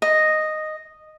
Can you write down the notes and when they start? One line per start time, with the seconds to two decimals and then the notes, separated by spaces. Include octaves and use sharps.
0.02 D#5